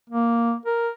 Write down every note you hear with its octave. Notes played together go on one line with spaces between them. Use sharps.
A#3
A#4